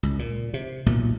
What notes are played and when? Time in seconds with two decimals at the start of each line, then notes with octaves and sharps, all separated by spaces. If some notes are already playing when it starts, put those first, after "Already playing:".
0.03 C#2
0.19 A#2
0.54 C3
0.86 B1 A#2 A3